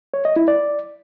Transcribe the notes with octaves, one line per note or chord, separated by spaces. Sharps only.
C#5
D#5
E4
D5